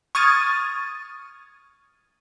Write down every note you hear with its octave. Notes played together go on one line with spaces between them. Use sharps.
C#6 D#6 F6 G#6 A6 D#7